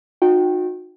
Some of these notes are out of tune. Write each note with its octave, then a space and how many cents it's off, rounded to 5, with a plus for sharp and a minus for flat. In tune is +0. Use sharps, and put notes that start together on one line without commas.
D#4 -20 F#4 -40 G5 -10